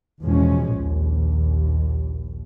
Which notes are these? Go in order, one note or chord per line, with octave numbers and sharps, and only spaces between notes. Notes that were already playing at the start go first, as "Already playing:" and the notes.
E2 B2 F3 G#3 C#4
A#1 D#2